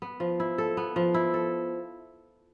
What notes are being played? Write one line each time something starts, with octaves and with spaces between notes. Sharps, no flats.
B3
F3
E4
A4
B3
F3
E4
A4